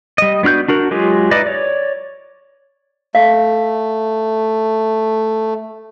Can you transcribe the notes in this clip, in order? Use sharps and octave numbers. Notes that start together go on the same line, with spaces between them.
G3 D#5
B3 D4 F#4 F6 G6
D4 F#4 A#4
F#3 G#3 F4 G4 G#4
D#4 E4 B4 D5 D#5
C#5 D5
A3 F5